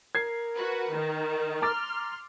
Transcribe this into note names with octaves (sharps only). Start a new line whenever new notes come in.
A#4 G#6 C7
F#4 B4
D#3
A#5 C6 D6 F6 A6